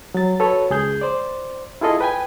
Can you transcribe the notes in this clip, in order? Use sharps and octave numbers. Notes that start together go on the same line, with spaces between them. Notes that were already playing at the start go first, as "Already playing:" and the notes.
F#3 A6
F#4 A4 B4 C#5
C#2 G#4 G6
C5 D5
E4 F4 G#4 A4 D#5
B4 G5 G#5